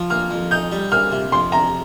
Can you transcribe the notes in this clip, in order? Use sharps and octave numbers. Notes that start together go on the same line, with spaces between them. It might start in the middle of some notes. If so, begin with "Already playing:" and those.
Already playing: F3
A#3 F6
F2
D#4 G6
G3
A#3 F6
C3
F2 C6
C3 A#5